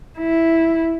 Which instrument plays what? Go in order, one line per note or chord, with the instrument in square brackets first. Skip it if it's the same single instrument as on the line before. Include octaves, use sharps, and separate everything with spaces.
[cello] E4